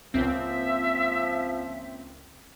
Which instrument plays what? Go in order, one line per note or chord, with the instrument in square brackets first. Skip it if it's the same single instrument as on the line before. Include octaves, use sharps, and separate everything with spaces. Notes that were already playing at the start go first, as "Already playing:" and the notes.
[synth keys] C#2 A#3 C4 [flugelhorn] F3 [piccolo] E5